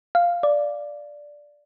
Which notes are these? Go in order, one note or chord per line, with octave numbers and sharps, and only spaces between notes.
F5
D5